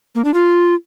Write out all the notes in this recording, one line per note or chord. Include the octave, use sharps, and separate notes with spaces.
A#3
D4
F4